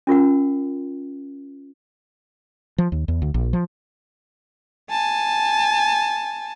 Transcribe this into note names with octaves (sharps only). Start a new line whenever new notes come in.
C#4 F4 A#4 F#5
F3
D#2
E2
D2
A#1
F3
G#5 A5